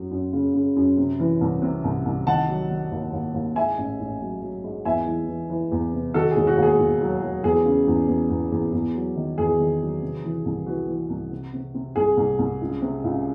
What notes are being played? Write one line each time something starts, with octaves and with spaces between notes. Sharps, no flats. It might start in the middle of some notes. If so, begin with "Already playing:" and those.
Already playing: F#2 F#3
F#2
C#3
C#3
F#2
C3
E3
C2
C3
C2
C2
D#3 F#5 A5
F#3
D#3
D#2
D#2
D#2
G#2 E5 G#5
A1
A1
F#3
F#3
G#2
E2 E5 G#5
E3
E3
E3
E2
C3
D#3 F#4 A4
G#4
E1
F#4
D#2
G#4
E1
F#3
F#3
E2 G#4
C#3
E2
E2
E2
E2
E2
F#3
D#3
E2 G#4
D#3
F#3
C3
E3
C2
E3 F#4
E3
C2
C3
C3
C3
C2 G#4
C2
C2
C#2
C3
C#2